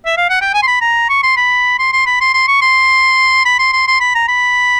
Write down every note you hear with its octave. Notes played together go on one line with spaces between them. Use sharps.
E5
F5
F#5
G5
G#5
C6
B5
A#5
C#6
C6
B5
C6
C6
B5
C6
C6
C#6
C6
B5
C6
C6
C6
B5
A#5
B5